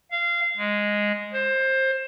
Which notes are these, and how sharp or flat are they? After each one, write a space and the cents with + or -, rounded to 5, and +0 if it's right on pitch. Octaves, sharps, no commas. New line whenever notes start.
F5 -20
G#3 -5
C5 +20